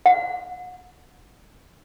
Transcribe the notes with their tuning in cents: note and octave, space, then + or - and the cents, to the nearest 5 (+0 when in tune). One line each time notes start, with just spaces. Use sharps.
F#5 -35